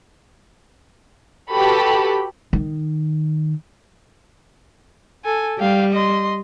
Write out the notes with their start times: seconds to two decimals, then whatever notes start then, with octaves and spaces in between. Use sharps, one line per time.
1.54 F#4 G4 A4 B4 B5
2.53 D#3
5.24 A4 G#5
5.59 G3 F5 G5
5.93 D#5 C6